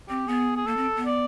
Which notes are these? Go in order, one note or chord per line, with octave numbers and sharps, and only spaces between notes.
C4 G4
B3 G#4
G#4
A#3 A4
C4
B3
D5